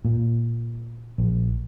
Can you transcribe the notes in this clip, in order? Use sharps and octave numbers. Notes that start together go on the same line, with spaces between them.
A#2
A#1